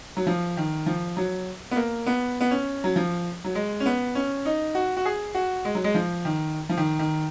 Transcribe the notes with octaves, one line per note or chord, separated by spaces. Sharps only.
F#3
F3
D#3
F3
F#3
B3
A#3
B3
B3
C#4
F#3
F3
F#3
G#3
C#4
B3
C#4
D#4
F#4
F#4
G#4
F#4
G#3
F#3
G#3
F3
D#3
F3
D#3
D#3